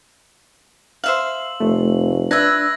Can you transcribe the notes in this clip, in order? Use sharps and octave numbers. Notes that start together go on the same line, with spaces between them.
C5 E5 F5 F#7
F1 A3
D4 B4 E5 E6 G#6 A#6